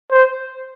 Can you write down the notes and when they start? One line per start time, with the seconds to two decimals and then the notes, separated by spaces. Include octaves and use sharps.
0.12 C5